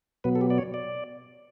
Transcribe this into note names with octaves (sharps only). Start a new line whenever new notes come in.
B2 F#3 B3 B4
A4
G4
D5
C#5
D5